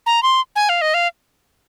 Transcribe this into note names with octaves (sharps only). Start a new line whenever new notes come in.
A#5
C6
G#5
F5
D#5
F5